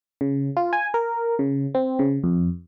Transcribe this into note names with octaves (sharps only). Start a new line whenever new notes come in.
C#3
F4
G#5
A#4
C#3
C4
C#3
F2